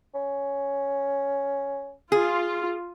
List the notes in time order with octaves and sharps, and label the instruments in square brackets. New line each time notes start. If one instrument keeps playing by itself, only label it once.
[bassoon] C#4
[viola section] F4 [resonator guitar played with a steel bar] G#4